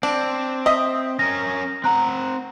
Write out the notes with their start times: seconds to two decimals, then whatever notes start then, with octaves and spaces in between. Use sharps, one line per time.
0.03 C4 D4
0.66 D#5 E5 D#6
1.19 C#4 A#4 A#6
1.84 C4 F#5 A#5 F#6